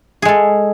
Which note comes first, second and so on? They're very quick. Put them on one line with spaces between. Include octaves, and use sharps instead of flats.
G#4 G#3 A4